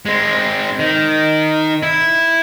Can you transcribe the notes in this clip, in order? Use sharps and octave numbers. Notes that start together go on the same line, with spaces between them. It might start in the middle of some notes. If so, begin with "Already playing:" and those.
G#3 C4
D#3
E4